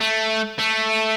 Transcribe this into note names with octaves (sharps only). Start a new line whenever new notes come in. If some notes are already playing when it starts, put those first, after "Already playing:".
A3
A3